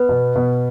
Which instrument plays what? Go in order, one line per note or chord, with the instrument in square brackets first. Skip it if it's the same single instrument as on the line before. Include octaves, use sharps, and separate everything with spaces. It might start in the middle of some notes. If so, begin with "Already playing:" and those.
Already playing: [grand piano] B3 [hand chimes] B4
[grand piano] B2
B2